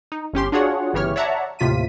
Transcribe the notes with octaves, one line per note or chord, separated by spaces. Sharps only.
D#4
G1 C#4 G4 C6
D4 F4 F#4 G#4 C#5 F#5
G1 C#3 E3 G4 C#5 F6
C#5 D5 E5 F#5 A5 A#5
D#2 A2 C3 F4 B6 D#7